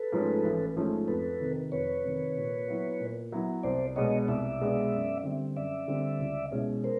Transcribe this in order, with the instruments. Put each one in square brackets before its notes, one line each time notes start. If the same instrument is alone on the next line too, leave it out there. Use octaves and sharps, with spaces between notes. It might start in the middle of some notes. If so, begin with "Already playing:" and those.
Already playing: [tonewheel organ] A4 B4
[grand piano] G#2 F3 A3 C#4
A1
G#2 F3 A3 C#4
[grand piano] F2 [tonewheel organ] A4 B4
[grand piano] C3 D#3
[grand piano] F2 [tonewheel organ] B4 C#5
[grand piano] C3 D#3
A#2
F#3 B3 E4
A#2
F#3 B3 E4
[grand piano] C2 [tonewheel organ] C5 D5
[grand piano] B2 G#3 B3 D4 [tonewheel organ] C#5 D#5
[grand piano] C2 [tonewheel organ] D5 E5
[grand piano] B2 G#3 B3 D4
F#2
D3 G3 C4
[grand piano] F#2 [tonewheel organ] D5 E5
[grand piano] D3 G3 C4
C#2
B2 G#3 C#4 E4
[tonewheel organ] A#4 C5